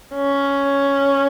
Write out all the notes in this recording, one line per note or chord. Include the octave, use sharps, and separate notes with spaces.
C#4